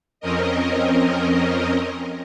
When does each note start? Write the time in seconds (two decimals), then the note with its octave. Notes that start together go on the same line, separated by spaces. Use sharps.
0.20 F2 C4 C#4 A#4 D#5